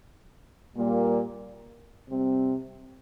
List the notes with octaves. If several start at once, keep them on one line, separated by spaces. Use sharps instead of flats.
A#2 G3 A#3
C3 G3 C4